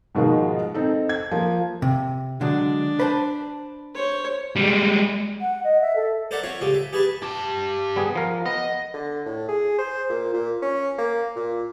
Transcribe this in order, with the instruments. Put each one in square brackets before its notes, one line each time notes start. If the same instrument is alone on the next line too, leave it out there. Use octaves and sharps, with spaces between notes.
[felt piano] G#2 B2 D#3 F3 G#3 A#3
C4 D#4 A4
G#6
F3 A#3
[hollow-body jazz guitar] C3
[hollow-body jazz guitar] D3 F#3 G#3 [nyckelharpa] D4
[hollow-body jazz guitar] B4 C5 A5
[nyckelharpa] C5 C#5
[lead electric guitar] G3 G#3
[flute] F#5
D#5
E5
A4
[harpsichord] A4 A#4 C5 D5 E5 F#5
C4 F4 C#5
C#2 C#3 G4 A4
E5
G4 G#4 B4 G#5 A5 B5
[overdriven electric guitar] G4 A5
[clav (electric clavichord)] G3 B3 G#4
F3 A#4
[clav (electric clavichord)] B3 [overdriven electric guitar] D#5
[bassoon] D3
A2
G#4
C5
A#2
A#2
C#4
A#3
A#2